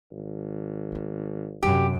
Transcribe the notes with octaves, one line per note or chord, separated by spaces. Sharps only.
G#1
B3 D#4
F#2 C3 C4 G4